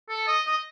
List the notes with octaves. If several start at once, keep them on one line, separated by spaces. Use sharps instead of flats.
A4
D#5
D#5